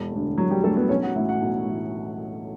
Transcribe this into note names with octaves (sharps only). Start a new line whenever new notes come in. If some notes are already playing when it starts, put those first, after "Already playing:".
Already playing: E1
D2 D3
E1 F#3 F#4
G3 G4
D2 D3 A3 A4
B3 B4
B1 C#4 C#5
F#4 F#5
A2 E3 E4 E5
F#4 F#5
B1
A2 E3